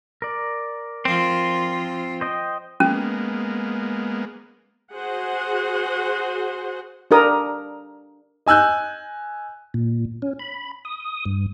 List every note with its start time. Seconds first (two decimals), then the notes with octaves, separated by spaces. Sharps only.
0.22 A#4 D5
1.05 F3 C4 F4
2.21 C5 D#5 G5
2.80 G#3 A#3 B3 C#4
4.93 F#4 G#4 C5 F#5
7.11 D4 G4 A#4 D#6
8.46 D#5 G#5 E6 F#6 G6
9.74 A#2
10.22 C#4
10.39 B5
10.85 D#6
11.25 G2